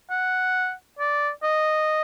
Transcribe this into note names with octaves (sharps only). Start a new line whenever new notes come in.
F#5
D5
D#5